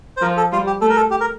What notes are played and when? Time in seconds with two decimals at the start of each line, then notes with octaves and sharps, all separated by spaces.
0.17 C5
0.22 F3 A#4
0.37 A4
0.52 G3 F4
0.67 G4
0.81 A3 A4
0.90 A#4
0.96 A4
1.11 G4
1.21 A#4